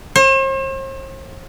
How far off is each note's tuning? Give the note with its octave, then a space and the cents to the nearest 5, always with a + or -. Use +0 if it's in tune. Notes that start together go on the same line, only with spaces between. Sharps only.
C5 +45